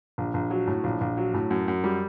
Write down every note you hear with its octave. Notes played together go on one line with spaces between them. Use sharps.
A#1
A#1
F#3
A2
A#1
A#1
F#3
A2
F#2
F#2
G3